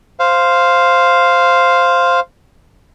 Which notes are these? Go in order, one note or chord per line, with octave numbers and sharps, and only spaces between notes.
C5 F5